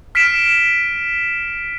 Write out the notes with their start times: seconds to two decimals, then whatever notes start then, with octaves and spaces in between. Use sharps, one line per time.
0.15 F6 B6 C7 D7 E7